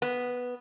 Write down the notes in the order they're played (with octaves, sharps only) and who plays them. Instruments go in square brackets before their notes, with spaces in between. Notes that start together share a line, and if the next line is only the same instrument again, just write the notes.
[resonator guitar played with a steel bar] B3